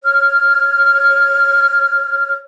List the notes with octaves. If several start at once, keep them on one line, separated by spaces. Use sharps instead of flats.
C#5 F6